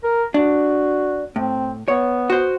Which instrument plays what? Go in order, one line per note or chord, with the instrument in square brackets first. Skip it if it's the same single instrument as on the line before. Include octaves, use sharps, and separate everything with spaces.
[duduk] A#4
[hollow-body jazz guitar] D4 [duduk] F#4
[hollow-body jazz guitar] A2 [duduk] C4
[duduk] B3 [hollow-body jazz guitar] C#5
[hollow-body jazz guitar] F#4 C5